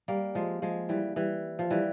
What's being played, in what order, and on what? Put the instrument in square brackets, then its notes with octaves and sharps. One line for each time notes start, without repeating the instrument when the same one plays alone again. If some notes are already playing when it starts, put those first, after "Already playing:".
[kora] G3 A#3
F3 G#3
F3 G#3
E3 G3
E3 G3
F3
E3 G3